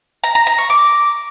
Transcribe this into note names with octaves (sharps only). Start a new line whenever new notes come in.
A#5
A#5
A#5
C#6
D6